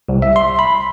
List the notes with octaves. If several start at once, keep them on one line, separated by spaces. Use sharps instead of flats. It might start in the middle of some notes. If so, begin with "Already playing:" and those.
C2
E5
C6
B5